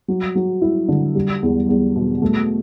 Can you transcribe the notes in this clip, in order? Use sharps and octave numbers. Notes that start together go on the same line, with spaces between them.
F#3
F#3
E4
D3
G3
E2
E2
B2
A3